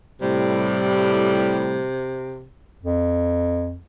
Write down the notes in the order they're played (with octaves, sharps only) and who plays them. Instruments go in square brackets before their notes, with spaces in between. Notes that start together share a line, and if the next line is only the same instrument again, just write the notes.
[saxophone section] A2 G3 [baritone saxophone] C3
[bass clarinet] F2